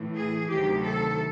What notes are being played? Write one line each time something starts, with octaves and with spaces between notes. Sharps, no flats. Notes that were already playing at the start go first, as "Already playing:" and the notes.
Already playing: A2 E3
G#4
D2 C3 D#3 F#3 G4
A4